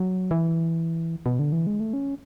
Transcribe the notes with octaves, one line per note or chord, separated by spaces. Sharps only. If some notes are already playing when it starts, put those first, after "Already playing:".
Already playing: F#3
E3
B2
D3
E3
G#3
A3
C#4